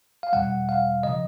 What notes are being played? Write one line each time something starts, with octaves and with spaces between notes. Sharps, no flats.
F5
E2 B2 G3 F#5
F5
C#3 F3 D#5